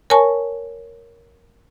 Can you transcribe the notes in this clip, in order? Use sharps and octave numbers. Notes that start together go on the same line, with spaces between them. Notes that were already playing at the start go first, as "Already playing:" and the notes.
A#4 C#5 G#5 A5 C#6